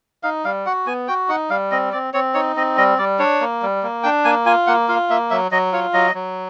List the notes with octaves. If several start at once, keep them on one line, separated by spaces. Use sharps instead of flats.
D#4 F5
G3 F5
F#4 F#5
B3 G#5
F#4 G5
D#4 F#5
G3 F5
C4 D#5
C4 D5
C4 C#5
D#4 C#5
C4 D#5
G3 D#5
G3 D5
D4 C#5
A#3
G3
A#3
D4 G5
A#3 G#5
F4 G#5
A#3 F#5
F4 F5
A#3 E5
F#3 E5
F#3 D#5
F4 C#5
F#3 D#5
F#3